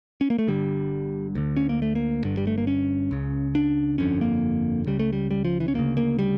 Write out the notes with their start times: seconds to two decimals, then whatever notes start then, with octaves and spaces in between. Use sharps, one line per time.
0.21 C#4
0.30 A#3
0.39 A3
0.47 G1 G2 D3 G3
1.35 D2 D3
1.57 C#4
1.69 A#3
1.82 A3
1.95 A#3
2.23 G1 G2 D3
2.37 G3
2.47 A3
2.58 A#3
2.67 C#4
3.11 C#2 C#3
3.55 D4
3.98 G1 F2 D3 C#4
4.21 A#3
4.86 C#2 C#3 G3
4.99 A3
5.13 G3
5.31 G3
5.45 F3
5.60 E3
5.68 C#4
5.74 D2 C#3 A#3
5.97 A#3
6.19 G3